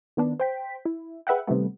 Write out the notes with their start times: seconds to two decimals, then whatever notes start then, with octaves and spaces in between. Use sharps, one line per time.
0.17 D#3 B3 D4
0.40 C5 G5 B6
0.85 E4
1.27 G#4 B4 E5 F#5 G5
1.47 C3 D#3 G3 A3 B3